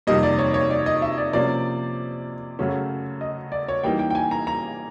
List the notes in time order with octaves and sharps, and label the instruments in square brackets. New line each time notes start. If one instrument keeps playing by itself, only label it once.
[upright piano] F2 C3 D#3 G3 A#3 D#5
D5
C#5
C#5
D5
D#5
E5
D5
C3 F3 A#3 C#4 D5
F#2 C#3 F#3 A3 C#4
D#5
D5
C#5
E3 G3 A#3 D#4 G5
G5
G5
G#5
A#5
A#5